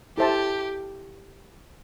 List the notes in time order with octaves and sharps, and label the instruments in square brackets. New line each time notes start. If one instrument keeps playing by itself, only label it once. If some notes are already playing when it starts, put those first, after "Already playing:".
[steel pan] E4 A4 C5 E5 A5 [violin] G4